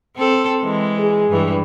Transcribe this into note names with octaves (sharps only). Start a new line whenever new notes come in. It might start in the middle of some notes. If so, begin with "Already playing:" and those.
C4 A4
E3 G#3
G#4
G2 E3